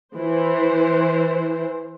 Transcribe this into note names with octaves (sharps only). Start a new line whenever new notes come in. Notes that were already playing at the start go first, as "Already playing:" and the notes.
E3 C5